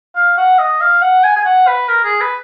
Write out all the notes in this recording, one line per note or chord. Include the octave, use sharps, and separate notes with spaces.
F5
F#5
D#5
F5
F#5
G#5
G#5
F#5
B4
A#4
G#4
B4